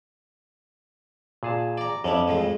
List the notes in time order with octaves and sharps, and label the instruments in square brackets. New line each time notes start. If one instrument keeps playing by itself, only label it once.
[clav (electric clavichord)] A#2 G#4 A5
[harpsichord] D5 A#5
[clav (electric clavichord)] F2 [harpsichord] C#4 D4 E4
[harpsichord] A2 F3 G#3